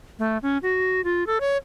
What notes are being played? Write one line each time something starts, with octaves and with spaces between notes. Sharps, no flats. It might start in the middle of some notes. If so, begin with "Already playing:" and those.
A3
C#4
F#4
F4
A4
C#5